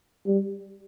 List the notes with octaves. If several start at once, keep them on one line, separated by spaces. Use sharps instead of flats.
G3